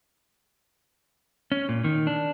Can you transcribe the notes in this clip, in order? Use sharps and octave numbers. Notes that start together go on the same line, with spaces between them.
C#4
A#2
D#3
D4